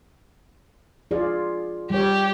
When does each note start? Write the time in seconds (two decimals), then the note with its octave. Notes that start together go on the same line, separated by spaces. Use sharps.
1.11 F4 G#4 D5
1.90 G3 G4 C#5